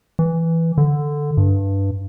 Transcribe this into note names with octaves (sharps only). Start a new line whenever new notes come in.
E3
D3
G2